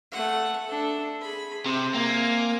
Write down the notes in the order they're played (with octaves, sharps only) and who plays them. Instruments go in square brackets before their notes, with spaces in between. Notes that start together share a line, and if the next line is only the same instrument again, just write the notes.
[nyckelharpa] A3 F#5
D4 A4
G#4 B5
[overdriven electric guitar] C3 [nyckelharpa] C5 E5
[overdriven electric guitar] A#3 [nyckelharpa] C4 G#5